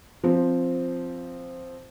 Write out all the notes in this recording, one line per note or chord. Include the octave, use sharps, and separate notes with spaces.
F3 C4